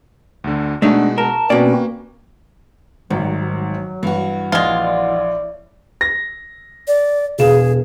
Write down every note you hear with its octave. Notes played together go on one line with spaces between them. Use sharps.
D2 D3
B2 G#3 A3 D4 D#4 F#4
A#4 A5
B2 A#3 C4 C#4 F#4 B4 D5
G#1 G#2 D#3 F#3 G3
G2 E3 F#4
A#1 G#3 E4 F4 C#5 D5
A#6
D5
E1 G#4 F5 E7